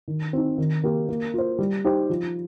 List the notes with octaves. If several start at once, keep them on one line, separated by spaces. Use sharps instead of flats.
D#3
C4 D#4
D#3
A#3 G4 A#4
A#3
F4 C5
G3
D#4 G4 C5
F3